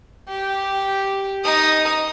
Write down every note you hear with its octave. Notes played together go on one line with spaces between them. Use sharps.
G4
D#4 D#6